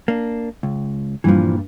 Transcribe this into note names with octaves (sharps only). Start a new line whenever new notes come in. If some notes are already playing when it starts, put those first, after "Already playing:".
A#3 D4
C#2
G2 A#2 E3 F3